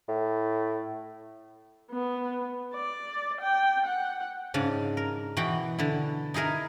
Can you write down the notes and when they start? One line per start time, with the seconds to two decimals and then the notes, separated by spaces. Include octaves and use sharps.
0.08 A2
1.91 B3
2.74 D5
3.41 G5
3.87 F#5
4.54 G#2 C#3 D4
4.97 A#4
5.37 B2 E3 F#4 F#5 G5
5.79 D3 E4
6.34 D#4 E4 G#4 A#4 E5